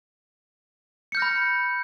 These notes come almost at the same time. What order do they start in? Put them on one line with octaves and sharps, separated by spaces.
C#7 G6 F6 A#6 B5